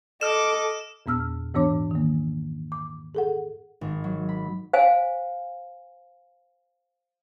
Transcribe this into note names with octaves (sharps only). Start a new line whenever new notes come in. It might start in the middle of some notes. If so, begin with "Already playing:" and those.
A4 D#5 D6 F6 E7
E2 A#2 B3 E6 F6
G#2 E3 B3 D4 C#5 D6
D#3 A#3
D6
G#4 A4 F#5
G#1
F#3
B5
C5 F5 G#5